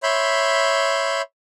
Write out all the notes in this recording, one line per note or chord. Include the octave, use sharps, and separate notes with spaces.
C#5 E5 B5 C6 G6